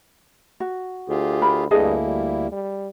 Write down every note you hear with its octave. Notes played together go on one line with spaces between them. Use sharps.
F#4
D2 F4 G4 G#4
A#4 B5
D2 G2 A#3 E4 G#4 A4 D#5
G3
G3